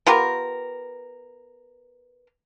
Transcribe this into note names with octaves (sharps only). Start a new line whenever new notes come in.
B3 F4 G4 A#4